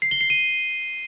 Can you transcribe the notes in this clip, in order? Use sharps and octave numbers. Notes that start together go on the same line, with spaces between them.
C7
G7
C7
D#7